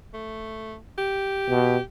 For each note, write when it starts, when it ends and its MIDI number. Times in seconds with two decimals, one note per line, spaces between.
0.14 0.76 57
0.98 1.81 67
1.50 1.77 47